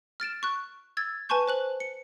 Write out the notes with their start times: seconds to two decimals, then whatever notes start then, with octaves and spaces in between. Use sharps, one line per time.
0.20 F6 A6 D7 E7
0.43 C#6 F#6
0.97 E6 G#6 A6
1.29 B4 G#5 A5 C6 C#6 G6
1.47 C5 F#6 F#7
1.80 C#7